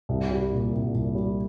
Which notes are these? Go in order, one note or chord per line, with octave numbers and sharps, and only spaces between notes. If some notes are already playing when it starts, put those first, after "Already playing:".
C2
G3
A#2
C2
C2
G3